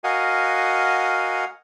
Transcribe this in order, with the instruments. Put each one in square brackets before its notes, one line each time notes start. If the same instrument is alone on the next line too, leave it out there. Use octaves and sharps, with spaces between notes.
[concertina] F#4 A#4 D#5 F5 F#5 G#5